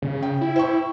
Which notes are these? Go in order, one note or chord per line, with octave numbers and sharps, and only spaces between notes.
C#3
C#3 G5
E4
C5 G5 C#6